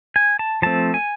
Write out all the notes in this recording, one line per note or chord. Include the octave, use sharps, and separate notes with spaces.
G#5
A5
F3 A3 C4 A5
G#5